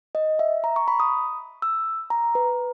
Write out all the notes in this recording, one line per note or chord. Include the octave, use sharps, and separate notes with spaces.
D#5
E5
A#5
C#6
B5
D#6
E6
A#5
B4